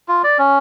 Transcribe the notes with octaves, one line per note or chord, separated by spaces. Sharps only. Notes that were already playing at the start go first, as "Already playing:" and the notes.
F4
D5
C#4